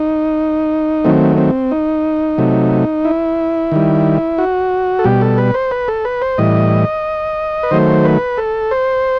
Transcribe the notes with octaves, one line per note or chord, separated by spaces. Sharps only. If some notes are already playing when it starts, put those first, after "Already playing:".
Already playing: D#4
D#3 F#3 A3 C4
C4
D#4
C3 F#3 A3
E4
D#3 G3
F#4
A4
B2 G3 G4
A4
B4
C5
B4
A4
B4
C5
A2 E3 G3 D#5
B4
D#3 F#3 A3 C5
B4
A4
C5